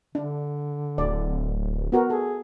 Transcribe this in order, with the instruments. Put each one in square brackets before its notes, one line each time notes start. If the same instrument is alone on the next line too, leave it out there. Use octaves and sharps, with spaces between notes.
[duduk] D3 [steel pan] D4
[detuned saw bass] D1 [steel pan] D5
[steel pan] B3 F#4 A#4
[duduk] G#4 [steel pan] A4